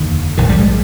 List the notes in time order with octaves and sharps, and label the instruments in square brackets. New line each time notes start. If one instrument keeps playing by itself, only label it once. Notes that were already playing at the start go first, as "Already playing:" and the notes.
Already playing: [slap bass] F1 D#2 D3
A#1 G#2 D#3
G3
G#3